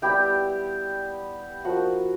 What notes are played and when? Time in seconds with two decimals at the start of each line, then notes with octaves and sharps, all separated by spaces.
0.02 G3 B3 E4 G4 G5
1.64 F3 A#3 D#4 F#4 F#5